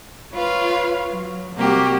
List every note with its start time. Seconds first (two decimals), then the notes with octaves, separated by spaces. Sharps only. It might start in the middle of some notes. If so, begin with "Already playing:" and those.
0.33 F4 B4 C#5 F5
1.09 F#3
1.55 C3 G3 A#3 F#4 G4